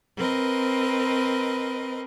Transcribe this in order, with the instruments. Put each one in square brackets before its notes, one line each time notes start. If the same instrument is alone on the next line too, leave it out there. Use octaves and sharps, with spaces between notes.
[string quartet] C4 A#4 B4 D#5